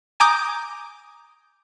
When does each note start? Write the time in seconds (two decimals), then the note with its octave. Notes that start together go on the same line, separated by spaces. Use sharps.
0.20 G#5 A#5 D6 D#6 G6